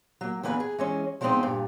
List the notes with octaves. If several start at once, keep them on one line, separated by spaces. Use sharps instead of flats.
F#3 A#3
E2 D3 A#3 B4 F#5 G#5
G#4
E3 G#3 C#4
F3 G3 G#3 B3 C4 D#4
G2 A#2